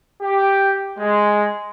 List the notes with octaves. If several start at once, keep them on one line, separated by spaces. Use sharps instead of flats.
G4
G#3